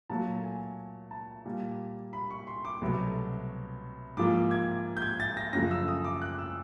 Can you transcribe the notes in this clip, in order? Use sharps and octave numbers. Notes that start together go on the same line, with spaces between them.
A#2 F#3 A3 A5
G#5
A5
A#2 G3 A#3
B5
C#6
C6
D6
C2 B2 F#3 A3
G#2 F3 A#3 D6
G#6
G6
G#6
A6
A#6
F#2 C#3 F3 A3 A#6
E6
D#6
D6
F#6
E6